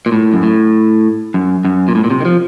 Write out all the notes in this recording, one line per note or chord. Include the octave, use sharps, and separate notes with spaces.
A#2
A2
F#2
A2
F#2
F#2
A#2
A2
A#2
C3
D#3
F3